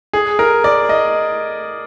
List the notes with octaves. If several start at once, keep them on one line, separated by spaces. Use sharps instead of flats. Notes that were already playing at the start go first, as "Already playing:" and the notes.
G#4
A#4
D5
D#5